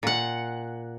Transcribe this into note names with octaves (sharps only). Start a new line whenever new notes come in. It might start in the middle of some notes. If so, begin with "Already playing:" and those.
A#2 F#5